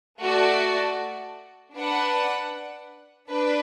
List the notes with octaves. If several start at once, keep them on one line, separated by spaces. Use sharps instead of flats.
A3 F#4 D5 A5
D4 B4 F#5
D4 B4